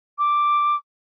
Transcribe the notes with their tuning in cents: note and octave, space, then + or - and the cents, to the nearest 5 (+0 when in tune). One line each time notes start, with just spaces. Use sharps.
D6 +5